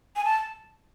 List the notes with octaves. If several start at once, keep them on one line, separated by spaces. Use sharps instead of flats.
G#5
A5